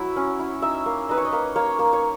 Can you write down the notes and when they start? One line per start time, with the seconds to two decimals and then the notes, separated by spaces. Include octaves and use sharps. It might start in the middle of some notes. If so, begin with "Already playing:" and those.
Already playing: F#3 E4 E5
0.16 C#4
0.40 E4
0.62 D#4 E5
0.86 A#3
1.09 D#4 B4
1.17 C#5
1.25 D#5
1.33 A#3
1.56 A#3 C#5
1.79 A#3
1.93 C#5